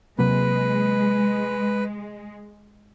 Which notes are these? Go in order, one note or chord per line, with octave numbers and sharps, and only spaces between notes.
C3 F#3 G#3 A#3 B4